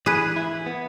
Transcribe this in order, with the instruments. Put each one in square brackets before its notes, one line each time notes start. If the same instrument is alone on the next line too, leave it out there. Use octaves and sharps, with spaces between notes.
[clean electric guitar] E3 [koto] G#4 B4
[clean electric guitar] E4
B3